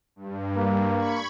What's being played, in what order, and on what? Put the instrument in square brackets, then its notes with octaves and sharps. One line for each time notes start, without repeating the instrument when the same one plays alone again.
[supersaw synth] G2
[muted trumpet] A#3
[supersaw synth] B5 C#6 G#6